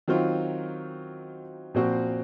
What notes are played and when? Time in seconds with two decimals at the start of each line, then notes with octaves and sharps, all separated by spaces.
0.08 D#3 F#3 C4 F4
1.74 A#2 F3 C4 F#4